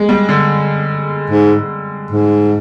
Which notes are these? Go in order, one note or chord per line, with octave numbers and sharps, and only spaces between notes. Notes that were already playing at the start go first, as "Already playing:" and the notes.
Already playing: G#3
G3
D3
G#2
G#2